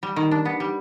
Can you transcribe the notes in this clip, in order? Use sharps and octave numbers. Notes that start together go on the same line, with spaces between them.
G3
D#3
D4
B3
G3